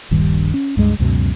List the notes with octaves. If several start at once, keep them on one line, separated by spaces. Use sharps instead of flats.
D#1 A#1 G2 D#3
C#4
C#2 G2 G#3
C#2 F#2 B2 F#3